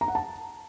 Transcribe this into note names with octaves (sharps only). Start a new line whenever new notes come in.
A#5
F#5
A5